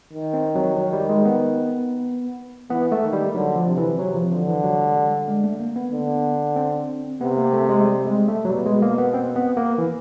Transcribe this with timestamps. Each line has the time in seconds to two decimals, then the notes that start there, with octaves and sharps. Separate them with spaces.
0.13 D#3
0.34 C4
0.56 F#3
0.77 F#3
0.93 G3
1.09 G#3
1.25 B3
2.70 E3 B3
2.92 A3
3.03 D#3
3.13 G3
3.35 D3 F#3
3.56 F3
3.66 C3
3.77 E3
3.99 C3 F#3
4.15 F3
4.31 D3 F3
4.47 E3
4.64 F#3
4.79 G3
4.96 G3
5.28 G#3
5.44 A3
5.60 A#3
5.76 B3
5.92 D3
6.56 C4
7.21 C3 B3
7.37 A#3
7.53 A3
7.69 G#3
7.85 G3
8.06 G#3
8.28 A3
8.45 F#3
8.49 B2 G3
8.66 G#3
8.82 A#3
8.98 B3
9.14 C4
9.36 B3
9.57 A#3
9.78 E3